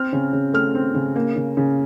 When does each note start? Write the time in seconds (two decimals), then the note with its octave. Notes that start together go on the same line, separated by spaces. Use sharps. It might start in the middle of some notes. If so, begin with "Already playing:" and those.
Already playing: C4 F6
0.13 C#3
0.33 C#3
0.53 A3 F6
0.75 C4
0.95 C#3
1.16 A#3
1.36 C#3
1.57 C#3